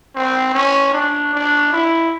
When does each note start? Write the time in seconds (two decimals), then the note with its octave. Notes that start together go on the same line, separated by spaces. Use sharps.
0.15 C4
0.54 C#4
0.93 D4
1.34 D4
1.73 E4